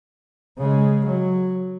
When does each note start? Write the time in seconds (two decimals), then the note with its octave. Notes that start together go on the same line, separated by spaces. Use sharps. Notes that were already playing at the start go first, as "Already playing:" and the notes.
0.58 C#3 G#3
1.06 F#3